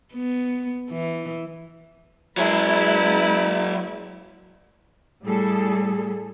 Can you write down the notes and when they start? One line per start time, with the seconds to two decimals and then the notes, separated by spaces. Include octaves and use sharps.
0.14 B3
0.90 E3
2.37 F#3 G#3 E4 G#4 B4
5.24 A2 G3 G#4 A4